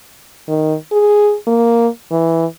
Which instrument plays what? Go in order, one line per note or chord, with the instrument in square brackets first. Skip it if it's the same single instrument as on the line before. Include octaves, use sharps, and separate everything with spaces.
[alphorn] D#3
G#4
A#3
E3